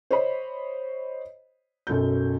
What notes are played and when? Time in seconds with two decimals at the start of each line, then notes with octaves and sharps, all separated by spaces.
0.11 C5 C#5 D#5 B5
1.87 B1 F#2 A4 G6